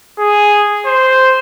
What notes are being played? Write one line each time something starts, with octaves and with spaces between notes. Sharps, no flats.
G#4
C5